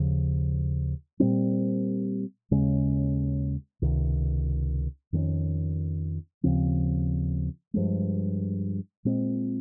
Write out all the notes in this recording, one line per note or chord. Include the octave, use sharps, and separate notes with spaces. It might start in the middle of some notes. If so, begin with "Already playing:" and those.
Already playing: D#2 C#3 F3
A#2 G3 C4
D#2 C#3 G#3 C#4
C#2 C3 D#3
F2 D#3 G#3 C#4
D#2 C#3 F3 C4
G2 F3 G#3
A#2 G#3 C4